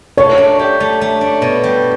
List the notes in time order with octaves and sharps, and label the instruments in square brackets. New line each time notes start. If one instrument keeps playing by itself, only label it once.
[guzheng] A3 [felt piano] C#5
[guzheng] D4
G4
A3
A3
D4
B2
G3